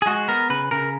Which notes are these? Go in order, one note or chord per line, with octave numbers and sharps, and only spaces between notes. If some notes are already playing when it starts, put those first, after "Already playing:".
G#4
G#3 F#4
B3 A#4
C#3 B4
C#3 A#4